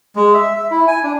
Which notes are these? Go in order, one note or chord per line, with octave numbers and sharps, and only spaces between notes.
G#3
E5
E5
E4
G#5
D4